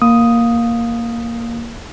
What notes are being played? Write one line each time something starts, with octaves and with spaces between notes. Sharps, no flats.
A#3 D#6